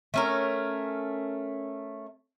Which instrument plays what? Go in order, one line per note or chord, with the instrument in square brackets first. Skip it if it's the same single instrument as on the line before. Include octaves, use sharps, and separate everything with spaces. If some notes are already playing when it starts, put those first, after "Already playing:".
[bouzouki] A3 C#4 A#4